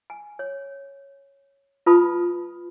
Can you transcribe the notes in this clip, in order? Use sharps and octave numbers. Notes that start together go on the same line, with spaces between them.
G#5
C#5
F4 B4 A5 B5 D#6